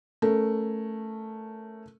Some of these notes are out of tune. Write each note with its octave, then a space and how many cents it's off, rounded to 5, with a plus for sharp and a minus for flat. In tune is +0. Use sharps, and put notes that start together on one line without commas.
A3 +0 C#4 +0 A#4 +0